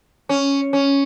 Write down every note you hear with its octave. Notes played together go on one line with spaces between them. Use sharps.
C#4
C#4